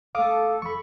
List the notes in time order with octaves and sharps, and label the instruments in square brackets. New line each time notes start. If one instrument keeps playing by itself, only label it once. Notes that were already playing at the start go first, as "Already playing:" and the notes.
[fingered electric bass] D#1 A3 [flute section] A4 [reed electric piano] F5 D6 D#6
[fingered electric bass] F1 F3 [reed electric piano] B5 C#6